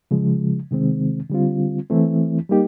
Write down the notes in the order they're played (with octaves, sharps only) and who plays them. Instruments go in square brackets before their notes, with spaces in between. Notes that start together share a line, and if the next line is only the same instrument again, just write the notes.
[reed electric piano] C#3 F3 G#3
C3 D#3 G#3 C4
D3 G3 C4 F4
E3 A3 C4 E4
G3 A#3 D#4 G4